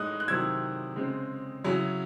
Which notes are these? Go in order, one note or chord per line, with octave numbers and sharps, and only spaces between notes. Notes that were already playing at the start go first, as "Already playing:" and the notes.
Already playing: A2 G#3 D#4 D#6 F#6
F#6
C3 D#3 F#3 C4 E4 E6 G#6
C#3 G#3 C4
C#3 F#3 C#4 E4